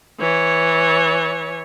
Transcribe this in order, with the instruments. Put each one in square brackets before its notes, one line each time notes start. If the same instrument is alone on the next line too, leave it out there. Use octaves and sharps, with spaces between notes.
[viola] E3 C#5